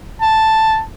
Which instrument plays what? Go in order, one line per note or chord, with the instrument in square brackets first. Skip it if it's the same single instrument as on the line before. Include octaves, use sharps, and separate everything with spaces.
[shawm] A5